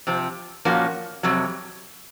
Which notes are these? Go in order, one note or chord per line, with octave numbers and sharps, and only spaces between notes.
C3 F3 C4
A#2 F3 A#3 C#4 F#4
F2 C3 F#3